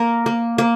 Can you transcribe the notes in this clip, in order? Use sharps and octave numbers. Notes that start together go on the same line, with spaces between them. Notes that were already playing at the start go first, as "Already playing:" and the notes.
Already playing: A#3 A#4
A#3
A#3